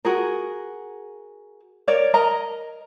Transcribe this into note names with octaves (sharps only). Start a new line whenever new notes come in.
F#4 G#4 A#4
A#4 C#5 D5
A#4 D#5 A#5